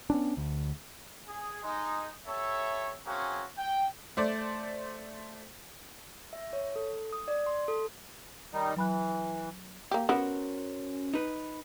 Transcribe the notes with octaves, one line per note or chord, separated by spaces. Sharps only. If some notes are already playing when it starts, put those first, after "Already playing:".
B3 C#4 D4
D2
G#4
G#3 D#4
E4 G4 A4 C#5 E5
A#3 C4 C#4 F#4 G#4
G5
A3 C5 D5
E5
C#5
A4
D#6
D5
C6
A4
D#3 G3 D#4
E3 F#3 B5 F#6
A#3 G4
B3 C#4 F#4 A#4 C5
D#4 B4